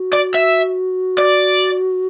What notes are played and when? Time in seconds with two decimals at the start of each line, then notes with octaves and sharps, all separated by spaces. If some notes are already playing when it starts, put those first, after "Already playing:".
Already playing: F#4
0.13 D5
0.35 E5
1.18 D5